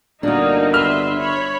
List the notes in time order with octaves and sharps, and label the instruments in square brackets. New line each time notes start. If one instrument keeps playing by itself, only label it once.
[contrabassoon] G1 [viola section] A#3 D#4 [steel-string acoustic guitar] D4 F#4
[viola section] B4 E5 C6 [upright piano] F6
[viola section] C#5 B5